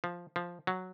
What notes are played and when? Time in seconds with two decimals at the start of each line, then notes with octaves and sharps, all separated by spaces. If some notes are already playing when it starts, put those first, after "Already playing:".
0.04 F3
0.36 F3
0.67 F#3